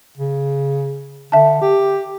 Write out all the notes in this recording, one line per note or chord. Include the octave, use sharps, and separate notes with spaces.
C#3
D3 E5 A5
G4